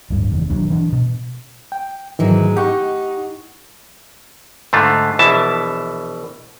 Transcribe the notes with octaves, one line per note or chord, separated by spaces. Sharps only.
D1 G2
F1 E2 D#3
E1 D#2 F#3 D4
E3 D4
B2
G5
G#2 D#3 E3 F#3 G#3
D#4 G4 F#5 C#6
G#2 D3 A3 F4
A#1 B2 E3 E5 A5